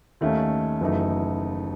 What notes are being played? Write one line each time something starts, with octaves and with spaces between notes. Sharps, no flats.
D#2 D#3 A3 C#4
F#1 F#2 E3 A3 D#4